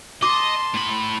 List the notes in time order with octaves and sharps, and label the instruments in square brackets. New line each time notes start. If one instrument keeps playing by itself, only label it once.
[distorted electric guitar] D#5 [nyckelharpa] A5 C6 [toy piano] D6
[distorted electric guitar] A2 B5